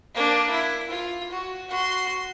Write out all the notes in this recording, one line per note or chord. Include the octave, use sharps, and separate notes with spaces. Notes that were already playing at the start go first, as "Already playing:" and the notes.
A#3 D4
E4
F4
F#4
F#4 C6